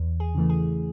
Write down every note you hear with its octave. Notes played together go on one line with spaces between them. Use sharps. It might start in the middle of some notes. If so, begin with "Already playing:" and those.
Already playing: E2
G#4
C#3 E3 A3
G#4